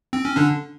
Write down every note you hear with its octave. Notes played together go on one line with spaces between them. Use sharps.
C4
C#4
D3 D4